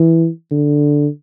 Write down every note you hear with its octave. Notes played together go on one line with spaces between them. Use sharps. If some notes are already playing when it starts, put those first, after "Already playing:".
Already playing: E3
D3